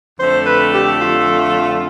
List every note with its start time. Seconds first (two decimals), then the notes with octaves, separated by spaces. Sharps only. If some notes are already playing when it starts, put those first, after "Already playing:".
0.19 F2 D3 A3 C5
0.46 B4
0.72 G4
1.01 F4